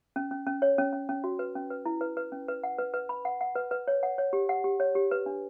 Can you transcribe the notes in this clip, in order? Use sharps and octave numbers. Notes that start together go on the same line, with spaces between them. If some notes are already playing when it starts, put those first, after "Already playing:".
C#4
C#4
C#4
C#5
C#4
C#4
C#4
F#4
B4
C#4
B4
E4
B4
B4
C#4
B4
F#5
B4
B4
B5
F#5
F#5
B4
B4
C#5
F#5
C#5
G4
F#5
G4
C#5
G4
B4
D4